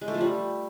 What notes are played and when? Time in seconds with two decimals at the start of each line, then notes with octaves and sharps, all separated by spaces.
0.01 G#3
0.08 A3
0.14 F3
0.21 G3